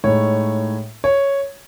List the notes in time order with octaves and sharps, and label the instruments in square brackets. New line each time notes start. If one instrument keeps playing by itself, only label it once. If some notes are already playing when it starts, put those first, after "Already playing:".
[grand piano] A2 G#3 D#4 C#5
C#5